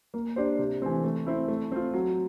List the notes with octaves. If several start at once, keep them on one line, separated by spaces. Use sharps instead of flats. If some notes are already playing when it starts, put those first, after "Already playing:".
A#3
D4 G4 C5
C3
E3 A3 C4
A3
C4 E4
A3
C4 F4
F#3